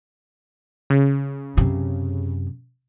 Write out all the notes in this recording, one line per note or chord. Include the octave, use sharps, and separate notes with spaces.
C#3
F#2 C3